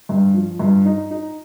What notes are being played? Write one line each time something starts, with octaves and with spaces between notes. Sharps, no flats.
G2
F3
G2
D#4
D#4